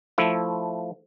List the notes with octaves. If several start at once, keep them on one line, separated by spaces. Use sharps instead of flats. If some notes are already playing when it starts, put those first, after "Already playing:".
F3 A3 E4